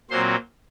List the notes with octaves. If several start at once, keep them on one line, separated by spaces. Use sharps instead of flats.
A#2 F#3 C4 C5 C6